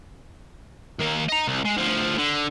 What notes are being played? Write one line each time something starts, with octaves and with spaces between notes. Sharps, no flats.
D#3 A#3
D#5 A#5
C2
G#3
D2 F3
D3